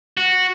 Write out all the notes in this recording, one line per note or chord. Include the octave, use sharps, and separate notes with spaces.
F#4